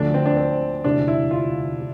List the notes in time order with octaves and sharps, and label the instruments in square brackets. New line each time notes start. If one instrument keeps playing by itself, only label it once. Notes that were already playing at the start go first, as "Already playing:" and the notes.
Already playing: [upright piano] D2 D3 F3 A3 [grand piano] D4
[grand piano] C4
D4
C4
[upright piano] E1 D2 C3 E3 [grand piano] D4
[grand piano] E4
F4
[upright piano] C3